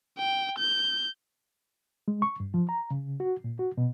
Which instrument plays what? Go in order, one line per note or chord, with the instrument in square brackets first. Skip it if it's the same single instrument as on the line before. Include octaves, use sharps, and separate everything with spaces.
[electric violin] G5
G6
[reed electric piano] G#3
C#6
G2
F3
A#5
C#3
F#4
A#2
F#4
B2